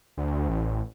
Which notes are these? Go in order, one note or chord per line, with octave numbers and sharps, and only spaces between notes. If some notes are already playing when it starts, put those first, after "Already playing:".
D2
A1